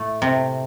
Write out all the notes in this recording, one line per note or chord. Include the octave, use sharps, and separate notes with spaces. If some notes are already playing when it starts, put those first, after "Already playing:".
Already playing: A2 A3
C3